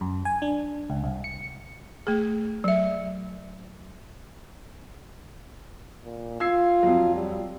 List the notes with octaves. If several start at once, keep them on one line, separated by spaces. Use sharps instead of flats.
F#2
G#5
D4
C#2
C2
C#7
A3 G#4
F#3 E5
A#2
F4 E6 G#6 C7
F2 F#3
G3